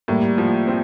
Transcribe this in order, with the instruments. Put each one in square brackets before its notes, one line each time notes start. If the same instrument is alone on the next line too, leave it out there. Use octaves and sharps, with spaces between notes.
[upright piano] A2 [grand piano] G3 A#3
[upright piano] F3
C4